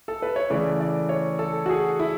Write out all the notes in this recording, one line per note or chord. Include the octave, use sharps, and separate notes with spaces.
A4
B4
C#5
C#3 E3 A3 D5
D5
C#5
A4
F#4
G#4
E4